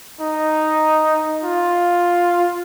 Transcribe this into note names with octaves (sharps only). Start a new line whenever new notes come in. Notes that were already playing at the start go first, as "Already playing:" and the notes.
D#4
F4